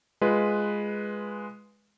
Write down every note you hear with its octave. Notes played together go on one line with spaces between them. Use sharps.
G#3 F4 B4